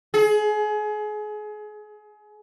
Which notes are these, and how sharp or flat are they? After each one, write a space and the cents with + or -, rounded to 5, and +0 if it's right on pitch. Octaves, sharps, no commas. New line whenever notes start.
G#4 +30